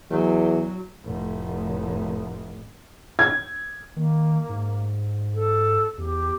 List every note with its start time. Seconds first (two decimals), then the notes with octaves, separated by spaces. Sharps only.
0.10 E2 F#3
1.03 F1 A2
3.19 G#6
3.96 D#3 A#3
4.49 G#2
5.35 A4
5.98 E2 G4